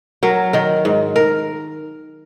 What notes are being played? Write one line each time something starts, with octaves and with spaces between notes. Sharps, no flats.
F#3 A#4
D#3 A#4
G#2
A#4